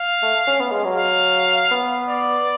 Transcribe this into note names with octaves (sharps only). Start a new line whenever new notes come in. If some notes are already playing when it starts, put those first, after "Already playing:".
Already playing: F5
A3
C#4
B3
G#3
F#3
F5
B3
D5